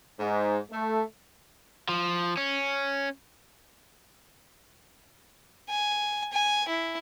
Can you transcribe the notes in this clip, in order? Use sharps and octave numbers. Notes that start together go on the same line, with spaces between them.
G#2
A3
F3
C#4
G#5
G#5
E4